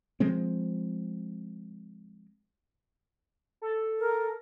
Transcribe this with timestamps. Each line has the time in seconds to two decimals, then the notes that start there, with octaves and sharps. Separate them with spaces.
0.20 F3 G#3 C4
3.62 A4
3.99 A#4